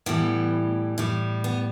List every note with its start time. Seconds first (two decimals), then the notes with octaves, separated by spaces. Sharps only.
0.06 A2 E3 G3 B3
0.98 A2 G3
1.44 B3